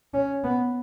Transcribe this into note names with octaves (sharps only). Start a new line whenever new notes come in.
C#4
B3